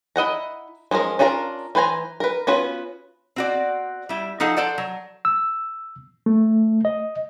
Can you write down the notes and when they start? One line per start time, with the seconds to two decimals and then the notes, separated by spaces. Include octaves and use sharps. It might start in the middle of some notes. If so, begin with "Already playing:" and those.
0.16 E4 D#5 F#5 A#5
0.91 F3 G#3 C#4 A#4
1.19 C#4 D4 F4 A#4 A#5
1.75 E3 B4 C5 G#5 A#5
2.20 A#4 B4
2.47 B3 C#4 F4 F#4 B4
3.36 C4 F#4 D5
4.09 G3 E4
4.40 F3 D#4 G#4 A4 F#5
4.57 A4 C5 D5 F#5
4.78 F#3
5.25 E6
6.26 A3
6.85 D#5